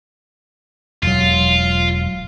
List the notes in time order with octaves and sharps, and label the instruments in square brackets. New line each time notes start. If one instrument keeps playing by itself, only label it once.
[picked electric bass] E1 F#3 [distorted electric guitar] F4